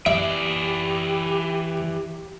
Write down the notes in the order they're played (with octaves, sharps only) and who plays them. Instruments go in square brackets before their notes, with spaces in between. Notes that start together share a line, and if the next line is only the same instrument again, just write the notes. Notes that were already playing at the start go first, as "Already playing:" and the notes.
[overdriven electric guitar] E3 D5 [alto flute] G4 [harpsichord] E5